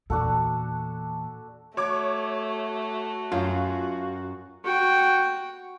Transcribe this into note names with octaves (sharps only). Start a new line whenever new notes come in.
E2 A#2 D4 F#4 A4
A3 F#4 C#5 D6
F#2 F4
F#4 G5